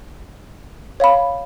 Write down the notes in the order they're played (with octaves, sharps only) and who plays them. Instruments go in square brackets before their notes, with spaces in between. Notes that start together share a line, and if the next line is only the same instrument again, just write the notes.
[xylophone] C#5 F5 B5